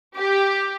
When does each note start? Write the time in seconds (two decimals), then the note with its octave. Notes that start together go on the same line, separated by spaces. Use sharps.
0.17 G4